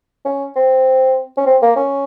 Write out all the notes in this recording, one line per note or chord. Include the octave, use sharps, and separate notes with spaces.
C#4
C4
C#4
C4
A#3
C#4